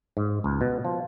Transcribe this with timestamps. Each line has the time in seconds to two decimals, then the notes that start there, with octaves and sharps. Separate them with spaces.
0.17 G#2
0.44 C#2
0.61 B2
0.85 F3